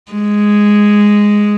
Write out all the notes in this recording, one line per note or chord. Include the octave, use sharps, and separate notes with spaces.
G#3